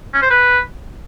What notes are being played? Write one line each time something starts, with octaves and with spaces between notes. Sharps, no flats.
C#4
C5
B4